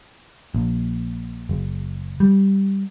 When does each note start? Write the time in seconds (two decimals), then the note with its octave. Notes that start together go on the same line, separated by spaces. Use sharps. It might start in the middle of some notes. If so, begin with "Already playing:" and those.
0.54 A#1
1.49 F#1
2.20 G3